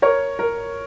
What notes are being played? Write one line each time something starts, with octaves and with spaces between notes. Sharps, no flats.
A#4 C#5
A#4